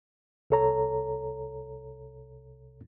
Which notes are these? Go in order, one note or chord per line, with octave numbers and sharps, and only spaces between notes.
C2 C3 A4 C#5 A#5